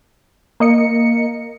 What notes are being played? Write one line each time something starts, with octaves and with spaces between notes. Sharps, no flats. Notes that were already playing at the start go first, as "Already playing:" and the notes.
A#3 D#5 C#7